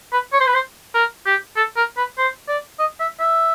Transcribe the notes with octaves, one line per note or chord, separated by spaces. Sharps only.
B4
C#5
C5
B4
C5
A#4
G4
A4
A#4
B4
C5
D5
D#5
E5
E5